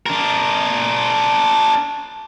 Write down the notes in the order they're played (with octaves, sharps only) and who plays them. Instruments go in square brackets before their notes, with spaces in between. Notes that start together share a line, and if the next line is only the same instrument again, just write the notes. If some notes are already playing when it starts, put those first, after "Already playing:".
[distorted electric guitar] D4 A#4